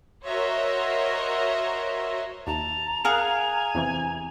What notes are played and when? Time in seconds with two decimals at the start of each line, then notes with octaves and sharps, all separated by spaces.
0.24 F#4 A#4 C5 C#5 D#5 E5
2.47 D#2 A5 A#5
3.05 G#4 A#4 F5 F#5 G#5
3.75 E2 C3 E3